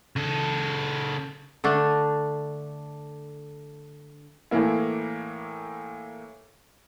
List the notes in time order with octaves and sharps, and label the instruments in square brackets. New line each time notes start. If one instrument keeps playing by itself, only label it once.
[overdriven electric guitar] C#3 A4
[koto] D3 A3 D4
[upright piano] A2 E3 A3 A#3 E4